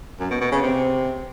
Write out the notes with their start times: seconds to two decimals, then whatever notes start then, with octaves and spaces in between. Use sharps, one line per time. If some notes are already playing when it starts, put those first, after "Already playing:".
0.20 F#2
0.31 B2
0.41 B2
0.52 C#3
0.62 C3